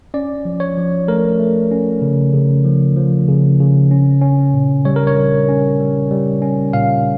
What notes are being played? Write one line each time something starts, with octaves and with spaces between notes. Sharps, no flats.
C#4 D5
F3
C#5
F3
A3 A#4
A3
C#4
C#3
C#3
F3
F3
C#3
C#3
C#4
C#4
A#2
G3 C#5
A#4
C#5
G3
C#4
G3
G3
C#4
A#2 F5